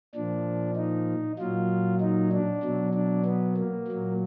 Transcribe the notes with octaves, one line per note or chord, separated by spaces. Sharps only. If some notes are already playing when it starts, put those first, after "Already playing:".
A#2 F3 D4
D#4
A#2 F#3 F4
D#4
D4
B2 F#3
D4
B3
A#3
A#2 F#3